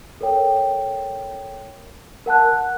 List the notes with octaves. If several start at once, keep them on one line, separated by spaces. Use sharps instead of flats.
A4 A#4 C#5 G5
A#4 F#5 A5 F#6